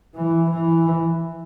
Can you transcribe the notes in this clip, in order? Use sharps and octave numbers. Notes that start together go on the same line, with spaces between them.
E3
E3